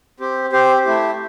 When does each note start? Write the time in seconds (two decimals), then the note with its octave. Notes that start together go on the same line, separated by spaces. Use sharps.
0.20 C4 G4
0.52 C4 G4 C5
0.85 A3 E4 G4